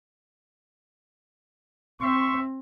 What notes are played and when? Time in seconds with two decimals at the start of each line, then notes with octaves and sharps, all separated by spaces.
2.01 C4 E5 C6 C#6